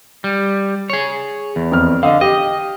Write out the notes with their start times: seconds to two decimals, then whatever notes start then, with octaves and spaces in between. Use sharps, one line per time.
0.24 G3
0.90 G#4 C#5
1.56 E2
1.72 F2 F6
2.03 D3 D#5 F5
2.21 G4 D#5